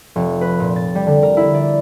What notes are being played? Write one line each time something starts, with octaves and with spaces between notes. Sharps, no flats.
F1
B4
A#2
A6
G3
D3
A#4
E4
D5